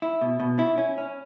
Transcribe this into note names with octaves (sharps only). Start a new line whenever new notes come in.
E4
B2
B2
E4
C#4
C#4